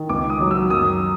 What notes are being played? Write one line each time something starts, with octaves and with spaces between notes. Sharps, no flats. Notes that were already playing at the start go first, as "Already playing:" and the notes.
Already playing: D#3
C#2 D6
D#6
F#3
E6
F#2 D#6